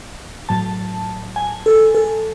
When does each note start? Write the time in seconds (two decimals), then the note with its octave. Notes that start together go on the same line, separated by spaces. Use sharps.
0.49 A2 F#3 A5
1.36 G#5
1.66 A4
1.95 A4